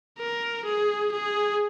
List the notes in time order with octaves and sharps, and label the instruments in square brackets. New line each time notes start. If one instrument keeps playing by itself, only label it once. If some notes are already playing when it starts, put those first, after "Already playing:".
[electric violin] A#4
G#4
G#4